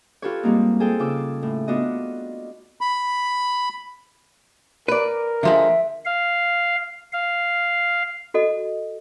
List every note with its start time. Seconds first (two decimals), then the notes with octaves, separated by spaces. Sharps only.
0.22 F4 G4 A4 B4 C#5
0.43 G#2 G3 A#3 C4 D#4
0.80 G#4 A4 C5 G5
0.99 C#3 F4 D6 E6
1.43 A2
1.68 B3 D4 F4 F#4 D#5
2.81 B5
4.88 A#4 B4 D5
5.43 D3 F3 G#3 E5
6.05 F5
7.13 F5
8.34 F#4 A4 D#5